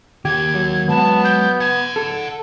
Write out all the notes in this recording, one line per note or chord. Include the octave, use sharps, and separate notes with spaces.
D#2 G4 G#6
F#3
G#3 B3 A5
G6
F#5 A5 G#6
A4